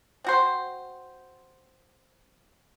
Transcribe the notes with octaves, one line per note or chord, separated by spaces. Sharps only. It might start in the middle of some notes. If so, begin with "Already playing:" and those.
C4 F#4 C5